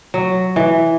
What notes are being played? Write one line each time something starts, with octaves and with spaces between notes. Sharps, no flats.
F#3
E3